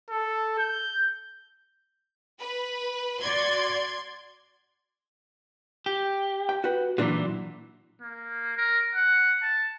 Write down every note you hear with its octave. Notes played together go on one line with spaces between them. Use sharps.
A4
G6
B4
F#4 D5 C6 G#6
G4
G5
F#4 B4
A#2 E3 F#3 D4 F#4
A#3
A#4
F#5
A5